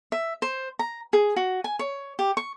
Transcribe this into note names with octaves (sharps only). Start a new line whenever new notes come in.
E5
C5
A#5
G#4
F#4
G#5
C#5
G4
C#6